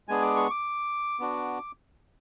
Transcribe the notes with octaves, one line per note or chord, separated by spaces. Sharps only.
G#3 B3 D4 G#4 G#5
D6
C#6
D6
B3 D4 F#4